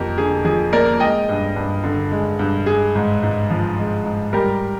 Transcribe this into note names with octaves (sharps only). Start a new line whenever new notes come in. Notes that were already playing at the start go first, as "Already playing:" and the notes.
Already playing: F2 A#3 G4 A#4
D3 G#4
F3 G#4
A#3 A#4 D5
G#3 D#5 G5
G2
G2
D3
G#3
G2
G#3 G#4
G#2
G#2
F3
G#3
G#2
G3 G4 A#4